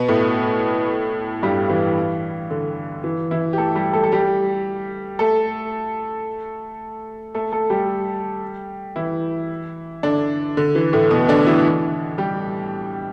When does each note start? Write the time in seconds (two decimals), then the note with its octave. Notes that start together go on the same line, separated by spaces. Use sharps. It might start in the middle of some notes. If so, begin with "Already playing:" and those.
Already playing: B2 B3
0.08 A2 A3
1.43 G2 G3
1.70 E3
2.50 D3
3.04 E3
3.31 E3 E4
3.53 G4
3.58 A3 A4
3.75 G3 G4
3.93 A3 A4
4.04 A4
4.12 G3 G4
5.19 A3 A4
7.35 A3 A4
7.52 A3 A4
7.70 G3 G4
8.96 E3 E4
10.03 D3 D4
10.57 D3
10.75 E3
10.93 A2 A3
11.11 B2 B3
11.28 D3 D4
11.47 E3 E4
12.18 G3 G4